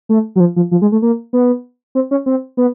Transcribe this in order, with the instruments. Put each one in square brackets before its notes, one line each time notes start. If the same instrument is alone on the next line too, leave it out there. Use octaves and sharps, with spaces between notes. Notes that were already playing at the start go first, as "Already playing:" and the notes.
[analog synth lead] A3
F#3
F3
F3
F3
G#3
A3
A#3
B3
C4
C#4
C4
B3